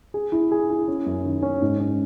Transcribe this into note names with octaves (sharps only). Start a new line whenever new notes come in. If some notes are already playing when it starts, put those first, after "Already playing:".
G#4
E4
G#4
E4
C#4
F#2
D#3
C#4
G#2
C#4